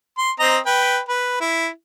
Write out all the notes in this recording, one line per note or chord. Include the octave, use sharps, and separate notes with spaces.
C6
C4 D#5 A#5
B4 G5
B4
E4